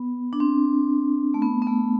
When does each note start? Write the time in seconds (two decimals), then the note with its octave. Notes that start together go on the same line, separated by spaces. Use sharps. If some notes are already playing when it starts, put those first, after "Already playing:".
Already playing: B3
0.33 D4
0.40 C4
1.34 A3
1.42 B3
1.62 B3
1.67 A3